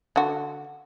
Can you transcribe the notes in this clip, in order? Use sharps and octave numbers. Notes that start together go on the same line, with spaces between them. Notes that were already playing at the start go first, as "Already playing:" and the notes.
D3 F#4